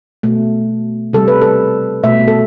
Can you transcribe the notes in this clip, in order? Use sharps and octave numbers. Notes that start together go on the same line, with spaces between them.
B2 A3
C3 G3 A4
B4
A4
B2 A3 E5
A4